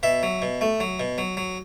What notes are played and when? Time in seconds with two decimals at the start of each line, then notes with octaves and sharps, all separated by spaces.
0.03 B2 E5
0.23 F#3
0.42 B2
0.61 A3
0.80 F#3
1.00 B2
1.18 F#3
1.37 F#3